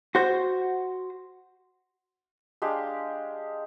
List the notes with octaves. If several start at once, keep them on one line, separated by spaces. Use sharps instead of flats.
F#4 C5
G#3 D4 G4 F5